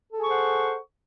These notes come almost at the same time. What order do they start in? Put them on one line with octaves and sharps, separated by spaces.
A4 G#4 C#6 C5 F#5